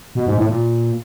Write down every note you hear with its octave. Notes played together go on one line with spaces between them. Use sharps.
B2
G#2
A2
A#2